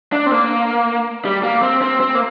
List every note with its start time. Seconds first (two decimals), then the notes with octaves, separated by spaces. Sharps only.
0.13 D4
0.26 C4
0.31 A#3
1.25 G3
1.43 A#3
1.62 C4
1.82 C4
2.00 C4
2.15 A#3